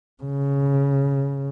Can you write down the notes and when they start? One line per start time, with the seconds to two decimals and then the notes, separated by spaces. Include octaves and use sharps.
0.23 C#3